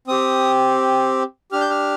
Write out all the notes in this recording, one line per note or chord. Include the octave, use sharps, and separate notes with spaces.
C4 G4 D#6
D4 G4 F6
G6
F6